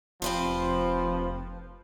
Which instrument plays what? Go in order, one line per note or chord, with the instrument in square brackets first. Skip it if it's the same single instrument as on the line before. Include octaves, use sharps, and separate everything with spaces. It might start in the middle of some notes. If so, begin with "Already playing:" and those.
[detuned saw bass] F1 [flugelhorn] F3 [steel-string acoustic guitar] C4 B4 C5